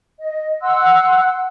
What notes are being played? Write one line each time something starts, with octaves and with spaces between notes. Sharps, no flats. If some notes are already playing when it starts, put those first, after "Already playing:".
D#5
F#5 C6 E6 F#6